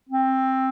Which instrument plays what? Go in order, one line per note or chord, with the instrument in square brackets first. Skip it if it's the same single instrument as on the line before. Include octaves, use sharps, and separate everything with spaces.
[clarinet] C4